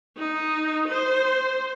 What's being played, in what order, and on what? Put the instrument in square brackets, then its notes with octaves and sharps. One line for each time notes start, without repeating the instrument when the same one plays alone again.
[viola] D#4
C5